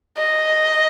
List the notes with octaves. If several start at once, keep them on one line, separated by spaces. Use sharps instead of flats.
D#5